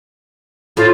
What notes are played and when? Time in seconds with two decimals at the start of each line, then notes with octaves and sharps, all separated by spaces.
0.77 A2 F4 C5 C#5